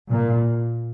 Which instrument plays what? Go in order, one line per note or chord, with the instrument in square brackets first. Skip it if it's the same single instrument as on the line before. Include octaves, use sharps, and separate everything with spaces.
[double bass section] A#2